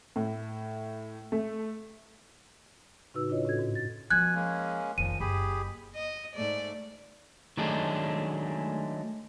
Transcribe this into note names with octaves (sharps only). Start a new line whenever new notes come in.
A2
A3
A2 C#3 D#4 F#4 B4 E6
D4 E4 F4 B4 C#5 D#5
A2 C#4 F#4 A4 G#6
G#2
A6
B2 F3 F4 G#5 F#6 G#6
G#3 A#3 C#4
F1 A#2 D#3 F3 D#7
F#1 D4 G4 G#4 B5
D#5
G#2 A3 D5
D#3 F#3 G#3 A3 D4